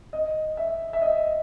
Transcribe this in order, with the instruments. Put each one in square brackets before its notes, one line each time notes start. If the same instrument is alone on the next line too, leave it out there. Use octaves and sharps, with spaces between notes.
[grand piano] D#5
E5
E5
D#5